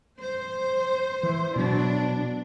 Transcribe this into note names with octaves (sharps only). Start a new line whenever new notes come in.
C5
E3
B2 F#3 D4